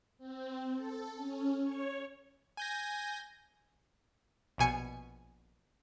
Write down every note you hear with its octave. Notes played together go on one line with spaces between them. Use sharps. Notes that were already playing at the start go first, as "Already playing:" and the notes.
C4
A4
C#4
C#5
G#5 G6 A#6
A#1 B2 G#5 C#7